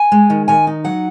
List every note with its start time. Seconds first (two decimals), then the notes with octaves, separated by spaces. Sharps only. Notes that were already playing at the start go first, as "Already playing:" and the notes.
Already playing: G#5
0.12 G#3
0.30 D#3
0.48 D#3 G#5
0.67 D#4
0.85 F#3 F#5